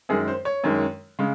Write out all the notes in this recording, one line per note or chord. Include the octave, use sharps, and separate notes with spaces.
F#2 D#3 G#3 G#4
C5
C#5
F#2 D#3 G#3
C#3 G#3